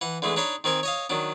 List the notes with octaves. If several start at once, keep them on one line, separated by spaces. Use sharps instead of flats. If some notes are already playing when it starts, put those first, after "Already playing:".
E3 F#5
D3 E3 G#3 A3
D4 D#4 C#5 B5 C6
D#3 C4 A#4 G#5
C#5 D#5 F5
D#3 F#3 D4